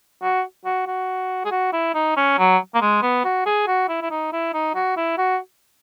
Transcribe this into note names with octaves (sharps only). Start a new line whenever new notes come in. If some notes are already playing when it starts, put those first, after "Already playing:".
F#4
F#4
F#4
G#4
F#4
E4
D#4
C#4
F#3
A#3
G#3
B3
F#4
G#4
F#4
E4
E4
D#4
E4
D#4
F#4
E4
F#4